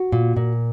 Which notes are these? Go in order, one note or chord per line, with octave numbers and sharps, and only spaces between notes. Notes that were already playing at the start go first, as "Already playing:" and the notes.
Already playing: F#4
A#2
A#2